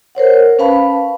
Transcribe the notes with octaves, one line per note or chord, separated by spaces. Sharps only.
A#4 C5 C#5 F#5
C#4 B4 F5 A5 B5